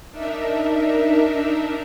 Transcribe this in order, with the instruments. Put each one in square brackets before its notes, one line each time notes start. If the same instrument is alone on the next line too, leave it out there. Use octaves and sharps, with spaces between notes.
[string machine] D4 D#4 A#4 E5